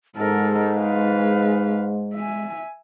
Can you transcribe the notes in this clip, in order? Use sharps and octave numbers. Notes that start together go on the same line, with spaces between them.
G#2 G#3 A4 A#4
B4 F5
E5 G#5